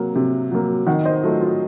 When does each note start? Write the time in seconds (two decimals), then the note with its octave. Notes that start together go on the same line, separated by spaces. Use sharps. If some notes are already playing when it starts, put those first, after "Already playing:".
Already playing: C3 F#3 A#3
0.16 C3
0.51 F#3 A#3
0.87 D#3 D#5 F#5
1.05 C5 D#5
1.23 F#3 A3 F4
1.41 F4